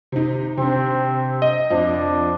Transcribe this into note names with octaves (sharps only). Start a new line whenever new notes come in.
C3 D#4
C3 C4 D4
D#5
F2 F3 D4